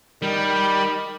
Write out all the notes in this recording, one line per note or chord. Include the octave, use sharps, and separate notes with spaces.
D#3 G3